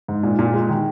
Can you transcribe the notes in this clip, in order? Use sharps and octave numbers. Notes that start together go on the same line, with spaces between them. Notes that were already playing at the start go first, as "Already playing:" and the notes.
G#2
A#2
A#2
G#3
D#3